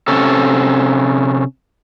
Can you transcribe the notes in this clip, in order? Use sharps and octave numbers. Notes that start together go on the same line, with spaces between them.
C3 C#4 A4